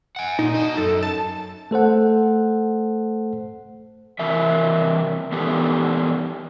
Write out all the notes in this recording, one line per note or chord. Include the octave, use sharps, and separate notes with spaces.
F#5 G#5
A#2 D#4
F#4 D#5
F#2 A4
A5
A3 A4 C5 F#5
C3 E3 A#4 E5
E3 B3 G4 A4